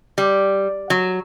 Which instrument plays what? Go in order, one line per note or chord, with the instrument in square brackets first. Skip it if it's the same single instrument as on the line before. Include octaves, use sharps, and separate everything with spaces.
[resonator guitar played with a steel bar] G3
F#3